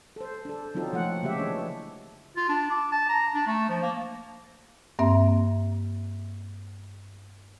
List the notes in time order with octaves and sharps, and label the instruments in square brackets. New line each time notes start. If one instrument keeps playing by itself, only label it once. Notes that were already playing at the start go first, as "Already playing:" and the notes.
[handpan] A4 C5
D4 A4
F#3 C4 D#4 F4 A4
F3 A3 A#3 F#5
C#3 G#3 A3 G4 E5
E3 D4 C#5
[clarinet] F4
D4
D6
A5
A#5
D4
A3
F3
A#3
[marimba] G2 A#3 C4 E5